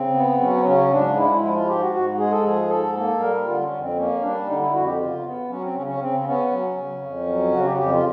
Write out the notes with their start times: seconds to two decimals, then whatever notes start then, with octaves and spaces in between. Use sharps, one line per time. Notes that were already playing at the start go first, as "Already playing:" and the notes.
Already playing: C#3 C4
0.14 B3
0.40 F#3 C#4
0.65 C#3 C#4
0.90 G#2 D4
1.16 G#3 E4
1.41 F3 E4
1.54 F4
1.67 G#2 G4
1.80 F#4
1.92 G#2 F#4
2.18 G#3 G#4
2.31 A4
2.43 F3 G#4
2.69 G#2 A4
2.95 A#3 A4
3.20 G3 A#4
3.45 D3 F4
3.62 C#4
3.71 F2
3.80 C4
3.96 A#3 C#4
4.21 G3 D4
4.46 D3 D#4
4.59 E4
4.72 F2 F#4
4.85 G4
4.97 C#3 F4
5.23 B3
5.48 F#3 C#4
5.61 C4
5.74 C#3 C#4
5.87 C#4
6.00 C#3 C4
6.20 C4
6.26 B3 C#4
6.51 F#3
6.76 C#3
7.02 F2
7.27 F#3
7.52 C#3 F#4
7.65 G4
7.77 F2 G4
7.91 F4